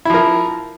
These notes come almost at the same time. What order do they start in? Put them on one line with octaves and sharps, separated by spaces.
E4 F3 A#4